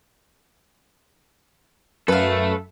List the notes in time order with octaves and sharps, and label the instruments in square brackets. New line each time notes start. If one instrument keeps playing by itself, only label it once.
[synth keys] F#2 [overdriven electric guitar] A4 E5 [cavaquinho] B4 F5